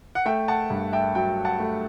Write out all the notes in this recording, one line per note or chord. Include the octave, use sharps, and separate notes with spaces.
F#5
A3 E5 G5
F#5 A5
G2
E5 G5
F#3 E5 G5
F#5 A5
A3